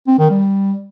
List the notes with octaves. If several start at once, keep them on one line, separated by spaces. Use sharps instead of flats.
C4
D#3
G3